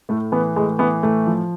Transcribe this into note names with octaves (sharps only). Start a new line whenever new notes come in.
A2 A3
E3 B3
A2 G#3
E3 B3
A2 A3
F3